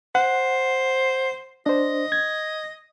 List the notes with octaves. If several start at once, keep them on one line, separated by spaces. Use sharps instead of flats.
C5 F#5
D4 C5 D#5
G#6